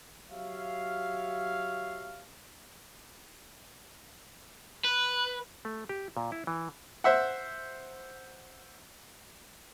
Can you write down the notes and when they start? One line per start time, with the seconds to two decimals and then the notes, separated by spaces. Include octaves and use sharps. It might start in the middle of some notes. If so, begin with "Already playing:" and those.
0.30 F#3 F#4 G4 C#5 E5 F5
4.85 B4
5.65 A3
5.89 G4
6.17 A#2
6.32 E4
6.47 E3
7.04 C5 E5 F#5